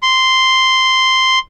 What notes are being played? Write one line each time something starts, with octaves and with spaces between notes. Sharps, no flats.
C6